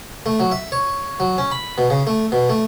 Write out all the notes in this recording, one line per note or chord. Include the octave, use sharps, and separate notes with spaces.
A3
F#3
E5
C#5
F#3
C#4
B5
B2
C#3
A3
B2
A3